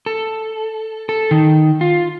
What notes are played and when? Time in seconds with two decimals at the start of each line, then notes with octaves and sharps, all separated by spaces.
0.06 A4
1.09 A4
1.31 D#3
1.81 F4